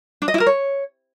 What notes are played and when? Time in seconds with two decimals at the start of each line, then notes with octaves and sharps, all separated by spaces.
0.22 D4
0.28 D#5
0.34 E4
0.40 A#4
0.47 C#5